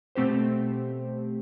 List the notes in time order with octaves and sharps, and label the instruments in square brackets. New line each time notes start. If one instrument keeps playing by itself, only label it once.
[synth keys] B2 A3 C4 G4 C5